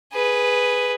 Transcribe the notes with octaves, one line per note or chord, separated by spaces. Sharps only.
G#4 B4